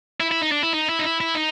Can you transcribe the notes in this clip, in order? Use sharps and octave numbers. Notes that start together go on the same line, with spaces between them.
E4
E4
D#4
D4
E4
D#4
E4
D#4
E4
E4
D#4